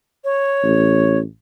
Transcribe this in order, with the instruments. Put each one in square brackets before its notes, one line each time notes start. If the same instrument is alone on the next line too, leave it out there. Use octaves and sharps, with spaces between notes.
[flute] C#5
[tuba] A1